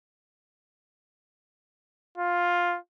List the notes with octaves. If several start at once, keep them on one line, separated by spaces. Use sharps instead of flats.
F4